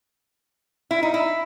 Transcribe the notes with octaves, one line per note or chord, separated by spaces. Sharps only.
E4
D#4
E4